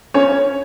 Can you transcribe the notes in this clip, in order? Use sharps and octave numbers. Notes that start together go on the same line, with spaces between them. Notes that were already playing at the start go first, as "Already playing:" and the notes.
C#4 C#5